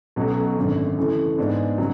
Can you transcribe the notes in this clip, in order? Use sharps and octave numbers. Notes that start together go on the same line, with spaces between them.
B1 B2 F#3 A3 C#4
G#1 F#2 D3
C#3 E3 A3
G#2 G#3 B3 D4
C#3 F#3